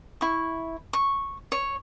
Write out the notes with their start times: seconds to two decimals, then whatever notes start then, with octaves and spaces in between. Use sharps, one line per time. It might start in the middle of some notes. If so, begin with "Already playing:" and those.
0.21 E4 C#6
0.93 C#6
1.52 C#5